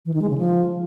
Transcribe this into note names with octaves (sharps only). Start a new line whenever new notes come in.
E3
D#3
G#3
C#3
F3